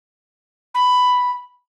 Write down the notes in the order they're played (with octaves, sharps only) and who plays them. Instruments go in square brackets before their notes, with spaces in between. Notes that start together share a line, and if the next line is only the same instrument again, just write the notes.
[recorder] B5